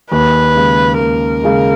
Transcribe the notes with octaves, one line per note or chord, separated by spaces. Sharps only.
D#2 B4
C#3 G#3
D#2 A#4
C#3 G#3